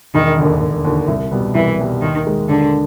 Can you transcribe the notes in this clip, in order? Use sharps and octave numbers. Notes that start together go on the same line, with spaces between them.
E1 D#3
D#2 D3
E1
D#2 D3
C2
B2 G3 B3
C2 E3
B2 G3 B3
D#2 D#3
D#3 G#3
D#2 D3